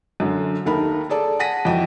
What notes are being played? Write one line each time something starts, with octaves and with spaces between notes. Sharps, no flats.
F#2 D3
D#2 A3 D#4 A#4 A5 B5
G#4 A4 D5 A5
F#5 G#5 A5 A#6 B6 D#7
F2 E3 F#4 D#5 G5